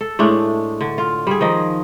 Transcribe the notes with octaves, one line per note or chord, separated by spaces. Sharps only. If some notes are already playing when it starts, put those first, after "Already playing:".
A4
A2 G#3 A3 D4
D3
F4
G3 G#4
D#3 F3 D#5